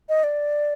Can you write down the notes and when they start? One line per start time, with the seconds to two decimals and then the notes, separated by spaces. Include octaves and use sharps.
0.09 D#5
0.24 D5